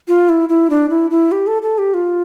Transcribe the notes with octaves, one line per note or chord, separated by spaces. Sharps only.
F4
E4
E4
D4
E4
E4
G4
A4
A4
G4
F4